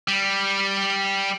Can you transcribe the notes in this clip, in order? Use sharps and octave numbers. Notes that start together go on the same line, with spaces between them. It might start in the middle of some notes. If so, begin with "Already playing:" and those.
G3